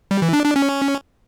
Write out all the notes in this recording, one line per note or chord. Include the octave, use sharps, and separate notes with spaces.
G3
E3
D4
D4
C#4